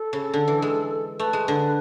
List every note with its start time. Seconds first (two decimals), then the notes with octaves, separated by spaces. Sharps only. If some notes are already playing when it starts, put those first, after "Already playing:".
Already playing: A4
0.13 C#3
0.33 D3
0.48 E3
0.62 G#3
1.19 A3 B4
1.33 G#3
1.48 D3